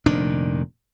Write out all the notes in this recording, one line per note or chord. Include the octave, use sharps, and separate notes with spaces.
F1 A#2 D#3 D4